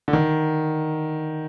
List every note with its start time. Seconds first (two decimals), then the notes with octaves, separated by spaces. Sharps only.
0.08 D3
0.13 D#3